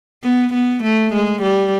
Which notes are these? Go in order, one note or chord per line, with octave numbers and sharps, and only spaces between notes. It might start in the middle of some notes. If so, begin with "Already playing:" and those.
B3
B3
A3
G#3
G3